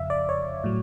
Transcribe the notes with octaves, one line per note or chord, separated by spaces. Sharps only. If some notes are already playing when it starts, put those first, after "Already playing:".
Already playing: F2 C#3 F3 E5 F5
D5
C#5
A2 F#3